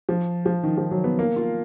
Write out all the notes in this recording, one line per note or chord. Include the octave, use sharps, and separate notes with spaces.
F3
F3
D#3
F3
F#3
B3
A#3
F4